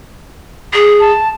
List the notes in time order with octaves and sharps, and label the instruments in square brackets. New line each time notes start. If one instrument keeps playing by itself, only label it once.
[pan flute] G#4
[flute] A5